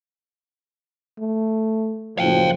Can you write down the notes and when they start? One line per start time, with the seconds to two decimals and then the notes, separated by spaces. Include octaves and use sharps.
1.18 A3
2.19 F#1 A2 F3 F#3 F5 G5